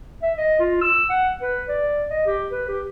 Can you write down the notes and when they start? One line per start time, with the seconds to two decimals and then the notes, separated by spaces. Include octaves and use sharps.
0.22 E5
0.38 D#5
0.59 F4
0.82 E6
1.10 F#5
1.42 B4
1.69 D5
2.10 D#5
2.26 G4
2.51 B4
2.68 G4